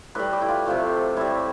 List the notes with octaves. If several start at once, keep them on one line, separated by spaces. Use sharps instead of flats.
A2 G3 B4
G4
E4
F4
C3 F3 A3
A2 G3 E4